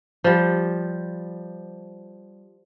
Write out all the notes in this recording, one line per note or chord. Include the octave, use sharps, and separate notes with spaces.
F3 G3